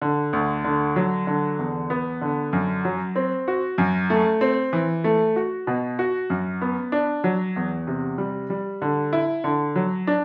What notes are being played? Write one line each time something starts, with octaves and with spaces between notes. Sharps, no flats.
D3
D2
D3
F#3
D3
E2
B3
D3
F#2
F#3
C4
F#4
F#2
A3
C4
E3
A3
F#4
B2
F#4
F#2
B3
D4
F#3
E2
C3
G3
G3
D3
E4
D3
F#3
D4